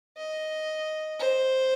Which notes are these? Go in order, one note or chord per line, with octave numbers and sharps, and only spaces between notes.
D#5
C5